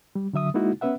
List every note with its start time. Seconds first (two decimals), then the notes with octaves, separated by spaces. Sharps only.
0.15 G3
0.33 D3 F#3 E5 D#6
0.54 G#3 A#3 D#4 E4 F#4
0.81 B3 C#4 B4 E5 F#5